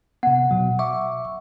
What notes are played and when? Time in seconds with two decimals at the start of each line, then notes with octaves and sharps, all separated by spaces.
0.23 C3 B3 F#5
0.51 B2 F#3
0.79 E5 C#6 D6